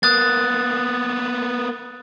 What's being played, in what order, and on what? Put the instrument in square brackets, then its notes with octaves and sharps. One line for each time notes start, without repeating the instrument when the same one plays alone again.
[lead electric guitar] A#3 B3 [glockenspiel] D#6 F#6 A6